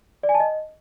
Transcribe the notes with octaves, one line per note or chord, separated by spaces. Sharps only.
D5
G#5
A5
D#5